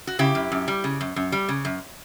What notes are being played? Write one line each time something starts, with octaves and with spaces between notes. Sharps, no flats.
F#4
C#3 E4 G4
F#2
F#2
G3
C#3
F#2
F#2
G3
C#3
F#2